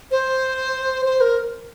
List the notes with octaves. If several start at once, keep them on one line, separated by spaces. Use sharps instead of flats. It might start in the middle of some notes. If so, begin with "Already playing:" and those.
C5
C5
A#4